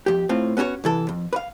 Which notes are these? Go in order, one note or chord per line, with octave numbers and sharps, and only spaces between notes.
F2 G4
A2 C4 F4
B3 C#4 F#4 A4 C#5
C2 E3 A4
F2
B4 F5